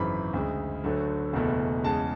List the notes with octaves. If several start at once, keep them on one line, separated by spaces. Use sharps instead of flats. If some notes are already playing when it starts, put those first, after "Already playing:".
Already playing: G#1 F#2 C#3 E3 B5
D2 C#3 G#3
D2 D3 F#3 A3
F#1 E2 B2 A3
E2 C#3 G#3 A5